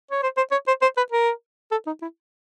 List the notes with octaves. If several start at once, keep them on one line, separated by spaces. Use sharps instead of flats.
C#5
C5
C5
C#5
C5
C5
B4
A#4
A4
D#4
E4